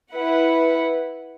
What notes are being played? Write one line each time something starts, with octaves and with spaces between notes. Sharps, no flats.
E4 B4 F#5